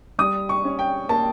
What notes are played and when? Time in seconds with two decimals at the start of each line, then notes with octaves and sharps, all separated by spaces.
0.19 G3 D#6
0.49 C#6
0.65 C#4
0.79 G5
1.09 A#3 A5